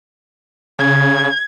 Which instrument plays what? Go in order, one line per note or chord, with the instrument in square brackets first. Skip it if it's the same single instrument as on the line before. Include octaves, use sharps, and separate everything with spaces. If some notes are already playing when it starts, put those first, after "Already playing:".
[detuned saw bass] C#3 [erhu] G#6